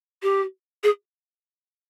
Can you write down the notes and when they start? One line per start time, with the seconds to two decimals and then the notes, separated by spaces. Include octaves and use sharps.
0.23 G4
0.83 G#4